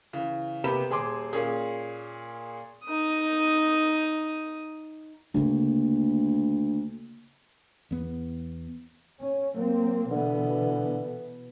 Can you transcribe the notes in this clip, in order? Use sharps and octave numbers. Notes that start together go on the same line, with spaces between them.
C#3 E3
C3 A#3 B3 G4 B5 E7
D#1 G#4 G#5 C6 D6
A#2 A#3 C#4 G#4
D#4 D#6
D2 C#3 A#3
E2 B3
C#4
F#3 A#3 C4
B2 D3 E3 B3